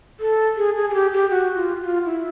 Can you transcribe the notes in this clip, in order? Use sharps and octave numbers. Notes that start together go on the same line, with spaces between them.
A4
G#4
G#4
G#4
G4
G4
F#4
F4
F4
E4